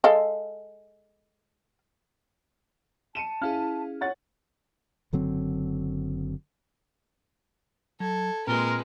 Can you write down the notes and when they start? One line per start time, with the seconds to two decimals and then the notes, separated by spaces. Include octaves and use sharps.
0.04 G#3 A4 F5
3.15 A5 C#7 D#7 E7
3.42 C#4 E4 G#4 F5 F6
4.01 C#5 F#5 A6
5.13 F#1 D3 F#3 C4
8.00 F#3 A4 G#6
8.47 A#2 G#3 C4 F4 A#4 B4 C6